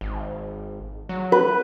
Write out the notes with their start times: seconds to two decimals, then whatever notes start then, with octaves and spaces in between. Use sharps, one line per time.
0.01 G#1
1.09 F#3
1.32 B4